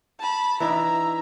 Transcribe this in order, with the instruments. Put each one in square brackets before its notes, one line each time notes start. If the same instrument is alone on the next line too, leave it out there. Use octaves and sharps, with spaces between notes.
[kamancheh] A5 B5
[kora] E3 D4 D#4 [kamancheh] E5 A#5